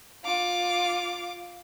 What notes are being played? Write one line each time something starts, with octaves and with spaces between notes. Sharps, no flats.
F4 D6